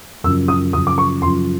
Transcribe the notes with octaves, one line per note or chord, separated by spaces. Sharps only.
F#2 C#3 F3 E6
D#6
F#2 C#3 F3 D#6
D6
C#6
F#2 C#3 F3 C6